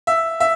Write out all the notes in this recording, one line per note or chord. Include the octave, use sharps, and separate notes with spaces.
E5
E5